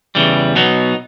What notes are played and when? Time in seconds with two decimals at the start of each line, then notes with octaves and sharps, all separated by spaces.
0.15 E2 C#3 E3 G3
0.55 B2 F#3 B3 D#4